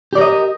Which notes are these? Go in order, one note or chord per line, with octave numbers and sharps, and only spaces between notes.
G4 A#4 D5 D#5